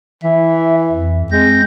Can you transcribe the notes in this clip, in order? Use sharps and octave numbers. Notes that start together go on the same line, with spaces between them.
E3 E5
F2
G#3 C4 G6 A#6